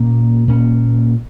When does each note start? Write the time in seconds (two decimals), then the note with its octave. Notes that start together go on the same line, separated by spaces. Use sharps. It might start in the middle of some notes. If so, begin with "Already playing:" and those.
Already playing: A#2 A#3 C#4
0.47 A#2 A#3 C#4